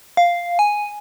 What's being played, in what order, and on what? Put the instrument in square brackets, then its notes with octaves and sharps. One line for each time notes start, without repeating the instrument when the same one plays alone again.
[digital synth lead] F5
G#5